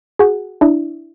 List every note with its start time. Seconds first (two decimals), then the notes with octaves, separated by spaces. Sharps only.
0.19 F#4 G#4
0.61 D4 E4